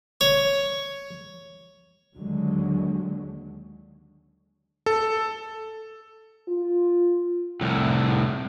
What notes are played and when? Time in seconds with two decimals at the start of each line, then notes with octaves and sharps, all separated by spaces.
0.21 C#5
2.15 D#2 D3 F#3 G#3
4.86 A4
6.48 F4
7.61 C2 A2